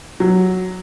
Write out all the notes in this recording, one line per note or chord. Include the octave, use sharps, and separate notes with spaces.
F#3